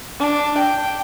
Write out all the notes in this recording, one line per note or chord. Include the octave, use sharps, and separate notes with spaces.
D4
G5